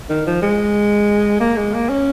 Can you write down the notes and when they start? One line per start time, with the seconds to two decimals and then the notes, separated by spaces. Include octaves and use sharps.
0.09 D#3
0.27 F3
0.42 G#3
1.40 A#3
1.57 G#3
1.74 A#3
1.89 C#4